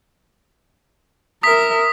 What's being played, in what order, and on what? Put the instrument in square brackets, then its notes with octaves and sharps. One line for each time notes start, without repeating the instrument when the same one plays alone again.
[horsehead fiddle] A#4 E5 [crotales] D#6 B6